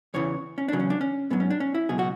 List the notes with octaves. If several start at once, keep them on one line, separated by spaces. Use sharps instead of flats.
E2 C#3 E3 C#5
C#4
E2 C#3 F#3 D4
C#4
D4
C#4
G#2 F#3 B3
C#4
D4
C#4
E4
C#2 B2 F#3 G#4
F#4